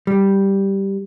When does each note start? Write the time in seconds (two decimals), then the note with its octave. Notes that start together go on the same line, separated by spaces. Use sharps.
0.07 G3